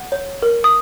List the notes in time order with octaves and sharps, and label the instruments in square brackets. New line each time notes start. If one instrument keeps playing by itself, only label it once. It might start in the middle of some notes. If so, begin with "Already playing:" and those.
Already playing: [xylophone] F#5
C#5
A#4
D#6